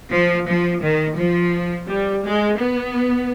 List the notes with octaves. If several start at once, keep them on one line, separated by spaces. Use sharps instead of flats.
F3
F3
D#3
F3
G3
G#3
B3